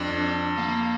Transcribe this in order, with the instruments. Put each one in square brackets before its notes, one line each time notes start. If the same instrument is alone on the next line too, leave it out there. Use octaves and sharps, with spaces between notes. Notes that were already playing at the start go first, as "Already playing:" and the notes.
Already playing: [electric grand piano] F2 [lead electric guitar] D4
[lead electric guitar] A#3